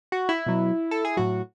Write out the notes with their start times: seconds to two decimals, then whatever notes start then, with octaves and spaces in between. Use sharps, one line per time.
0.12 F#4
0.29 E4
0.46 B2 F#3
0.91 A4
1.05 G#4
1.17 A2 F#3 F#4